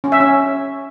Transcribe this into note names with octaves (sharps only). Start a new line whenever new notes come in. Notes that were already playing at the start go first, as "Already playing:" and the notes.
C#4
E5
C#4